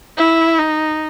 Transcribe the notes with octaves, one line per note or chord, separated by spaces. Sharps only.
E4
D#4